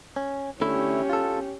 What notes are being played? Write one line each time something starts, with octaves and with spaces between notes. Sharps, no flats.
C#4
D3 A3 C#4 E4 G4
F4 A4